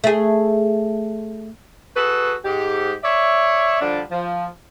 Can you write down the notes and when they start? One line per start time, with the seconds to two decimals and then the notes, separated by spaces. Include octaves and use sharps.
0.04 A3 G#4
1.96 F#4 G#4 A4 B4
2.44 G#2 G4
3.03 C#5 D5 E5
3.81 D3 F3 G3 D4
4.11 F3